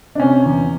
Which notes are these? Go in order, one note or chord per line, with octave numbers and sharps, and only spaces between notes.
D4
C3 C#4
E2